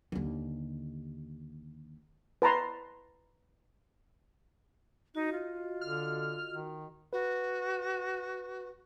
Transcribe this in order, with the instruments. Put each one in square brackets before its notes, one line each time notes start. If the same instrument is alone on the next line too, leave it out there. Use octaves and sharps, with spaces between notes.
[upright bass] D#2 D3
[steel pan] B4 A5 A#5 C6
[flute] D#4 [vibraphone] F#4 D#5
[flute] F4
[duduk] D3 [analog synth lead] F6
[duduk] D#3
[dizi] F#4 [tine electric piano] B4